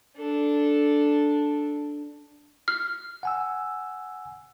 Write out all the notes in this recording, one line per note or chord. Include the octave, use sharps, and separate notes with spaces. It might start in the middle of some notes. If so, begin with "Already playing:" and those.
D4 A4
F6
F#5 G#5 E6